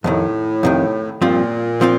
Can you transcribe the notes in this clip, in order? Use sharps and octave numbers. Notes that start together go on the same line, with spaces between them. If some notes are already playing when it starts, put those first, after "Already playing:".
F2 A2 C3 D#3
F2 C3 D#3
G2 A#2 F3 C4 F4
F3 C4 F4